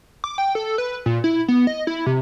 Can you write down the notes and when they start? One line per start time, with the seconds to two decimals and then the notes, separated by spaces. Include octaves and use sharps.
0.24 D6
0.38 G5
0.55 A4
0.78 B4
1.06 A#2
1.24 E4
1.48 B3
1.67 D#5
1.87 E4
2.06 C3